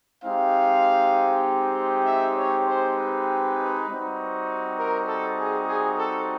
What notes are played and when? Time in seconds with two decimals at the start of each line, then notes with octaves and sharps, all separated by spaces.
0.24 G#3 C4 D#4 G4 F5
2.05 E5
2.36 C#5
2.67 C5
2.96 B4
3.87 G3 C4 D#4 F#4
4.78 A#4
5.08 A4
5.38 G#4
5.68 G#4
5.98 A4